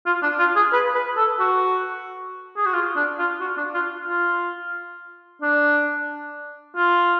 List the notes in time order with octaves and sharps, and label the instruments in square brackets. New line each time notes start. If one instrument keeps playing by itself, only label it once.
[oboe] F4
D4
F4
G#4
B4
B4
A4
F#4
G#4
F#4
F4
D4
F4
F#4
D4
F4
F4
D4
F4